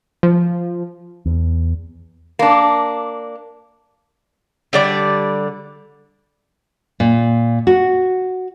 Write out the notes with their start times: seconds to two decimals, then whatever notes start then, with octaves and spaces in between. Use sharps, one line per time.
0.23 F3
1.26 E2
2.39 A#3 D4
4.73 D3 G3 D5
7.00 A#2
7.67 F#4